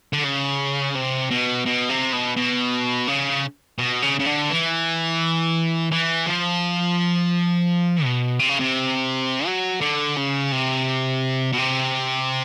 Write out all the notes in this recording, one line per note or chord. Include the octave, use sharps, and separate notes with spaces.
D3
C#3
C3
B2
B2
C3
B2
B2
C#3
B2
C#3
C#3
D3
E3
E3
F3
B2
C3
C#3
C3
F#3
D3
C#3
C3
B2
C3